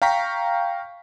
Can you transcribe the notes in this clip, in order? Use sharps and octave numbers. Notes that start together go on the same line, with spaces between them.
F5 G5 A#5 C#6 B6